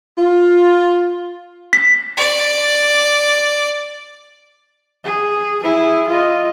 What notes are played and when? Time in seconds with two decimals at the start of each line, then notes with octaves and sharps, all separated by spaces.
0.19 F4
1.73 B6
2.17 D5
5.05 G#4
5.63 E4 G#4
6.08 F4 D#5